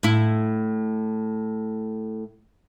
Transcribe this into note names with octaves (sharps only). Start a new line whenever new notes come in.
A2 E4